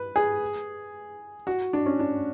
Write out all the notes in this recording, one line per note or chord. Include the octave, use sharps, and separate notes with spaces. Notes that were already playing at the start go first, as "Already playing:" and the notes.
Already playing: B4
G#4
F#4
D4
C#4
D4